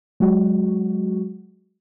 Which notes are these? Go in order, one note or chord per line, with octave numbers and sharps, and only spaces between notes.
F#3 G#3 F#4